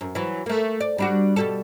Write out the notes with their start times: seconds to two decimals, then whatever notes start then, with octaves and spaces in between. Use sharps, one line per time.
0.01 F#2
0.15 E3 F#3
0.46 A3 A#3
0.80 D5
0.98 G3 D4 F#4
1.36 B2 G3 A4